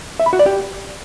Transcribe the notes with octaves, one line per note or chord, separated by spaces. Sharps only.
E5
B5
F#4
D5
G4